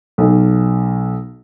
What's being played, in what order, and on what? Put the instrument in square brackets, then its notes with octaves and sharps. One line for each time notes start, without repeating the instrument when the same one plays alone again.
[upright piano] B1